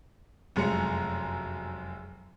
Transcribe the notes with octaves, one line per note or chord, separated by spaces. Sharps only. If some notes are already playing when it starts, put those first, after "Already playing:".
F1 F#2 G#3 A#5 C#7